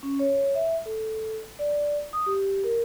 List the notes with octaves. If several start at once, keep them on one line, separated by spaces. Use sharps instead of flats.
C#4
C#5
E5
A4
D5
D#6
G4
A#4